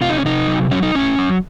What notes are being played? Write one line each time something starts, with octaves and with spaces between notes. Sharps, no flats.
C3 F4
D#4
C#4
C3 D#4
F#3
F#3 C#4
D#4
A2 C#4
F#3